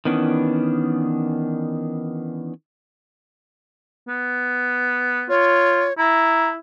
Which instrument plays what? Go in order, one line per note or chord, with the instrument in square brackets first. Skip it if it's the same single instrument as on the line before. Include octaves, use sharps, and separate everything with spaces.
[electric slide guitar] D#3 E3 B3 C#4 D4
[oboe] B3
[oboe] F4 [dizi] C#5
[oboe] E4 [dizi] A#5